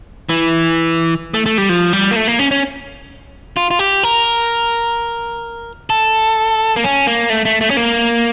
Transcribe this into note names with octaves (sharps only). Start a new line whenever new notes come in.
E3
A3
A3
G3
F3
G3
A#3
A3
A#3
C#4
C#4
F4
F4
G4
A#4
A4
A#3
C#4
A#3
A3
A3
A3
C#4
A#3